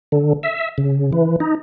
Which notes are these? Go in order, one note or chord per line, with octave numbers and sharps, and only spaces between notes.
D3
E5
C#3
E3
D#4